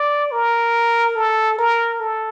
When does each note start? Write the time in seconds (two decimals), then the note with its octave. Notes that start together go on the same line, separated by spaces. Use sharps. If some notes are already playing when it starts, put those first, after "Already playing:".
Already playing: D5
0.32 A#4
1.16 A4
1.59 A#4
2.00 A4